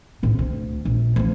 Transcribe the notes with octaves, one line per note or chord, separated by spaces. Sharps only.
A2 C3
D2
A#1
D2 F3